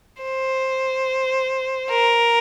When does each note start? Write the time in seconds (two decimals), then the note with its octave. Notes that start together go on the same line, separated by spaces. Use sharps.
0.22 C5
1.90 A#4